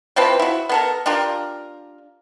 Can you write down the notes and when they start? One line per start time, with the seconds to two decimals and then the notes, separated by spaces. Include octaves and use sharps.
0.16 E3 F3 C4 B4
0.39 E4 F#4
0.69 B3 A4 A#4
1.06 D4 F4 G4 A#4